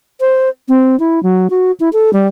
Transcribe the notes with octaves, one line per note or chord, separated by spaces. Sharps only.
C5
C4
E4
F#3
F#4
E4
A4
G3